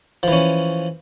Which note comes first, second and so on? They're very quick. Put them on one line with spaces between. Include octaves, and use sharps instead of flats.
F3 E3 C#4